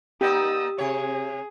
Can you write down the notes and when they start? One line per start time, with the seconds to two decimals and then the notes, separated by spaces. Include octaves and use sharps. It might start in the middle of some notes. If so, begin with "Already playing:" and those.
0.21 A#3 D#4 G4 D5 D#6 E6
0.78 C3 G#4 C#5